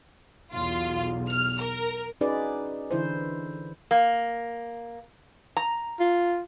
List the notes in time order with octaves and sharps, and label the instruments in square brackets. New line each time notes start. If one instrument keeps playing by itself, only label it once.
[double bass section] B1 E2 [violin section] F4
[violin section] F6
A#4
[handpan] C#4 D#4 F#4 G#4 B4 D5
D3 E3 E4 C5
[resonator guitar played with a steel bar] A#3
A#5
[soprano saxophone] F4